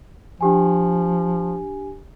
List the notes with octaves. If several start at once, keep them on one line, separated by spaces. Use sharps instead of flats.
F3 D4 G4 G#5